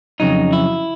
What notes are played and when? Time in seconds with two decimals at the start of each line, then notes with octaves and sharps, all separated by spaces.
0.20 F2 C#3 F#3 D#4
0.53 E4